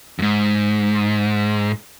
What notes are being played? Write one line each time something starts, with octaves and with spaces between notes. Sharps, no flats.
F2 G#2